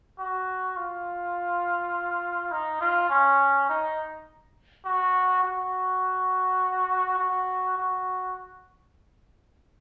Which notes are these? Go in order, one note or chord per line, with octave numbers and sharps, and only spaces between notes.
F#4
F4
D#4
F4
C#4
D#4
F#4
F#4
F#4
F#4